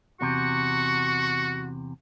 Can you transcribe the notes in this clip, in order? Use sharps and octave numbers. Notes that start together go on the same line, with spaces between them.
E2 C3 F#4 C#6